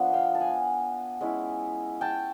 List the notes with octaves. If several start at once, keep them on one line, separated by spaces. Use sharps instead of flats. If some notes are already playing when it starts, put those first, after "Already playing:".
Already playing: F3 B3 D4
F5 G5
A5
F#5 G#5
G#3 C#4 E4
G5 A5